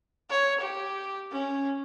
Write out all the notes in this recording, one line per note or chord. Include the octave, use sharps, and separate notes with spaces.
C#5
G4
C#4